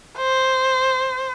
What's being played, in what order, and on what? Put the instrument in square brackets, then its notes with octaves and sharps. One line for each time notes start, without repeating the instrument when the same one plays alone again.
[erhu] C5